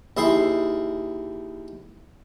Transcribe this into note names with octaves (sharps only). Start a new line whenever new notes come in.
D#2 E4 G#4 C6